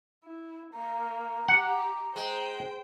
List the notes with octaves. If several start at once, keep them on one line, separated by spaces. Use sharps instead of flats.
E4
A#3 A#5
G4 F#5
G#3 C5 G5